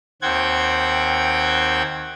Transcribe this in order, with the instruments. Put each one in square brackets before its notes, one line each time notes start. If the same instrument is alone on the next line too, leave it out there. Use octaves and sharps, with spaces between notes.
[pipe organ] D#2 C4 F#5 G5 G#6